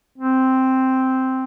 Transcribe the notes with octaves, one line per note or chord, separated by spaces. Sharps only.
C4